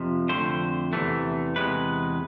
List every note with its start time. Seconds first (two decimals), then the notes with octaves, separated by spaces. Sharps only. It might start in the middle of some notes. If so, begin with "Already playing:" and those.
Already playing: F2 C3 F3
0.29 F2 D3 A3 C5
0.93 E2 C3 E3 A3
1.56 E2 C3 G#3 B4